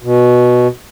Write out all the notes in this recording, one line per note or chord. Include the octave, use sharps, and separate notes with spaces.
B2